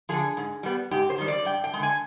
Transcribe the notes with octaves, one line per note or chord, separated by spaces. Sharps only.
D3 F3 G#4
G#2
G3 B3
G#2 G4
C5
D#3 G3
D5
G2 G5
G5
D3 G#3
G#5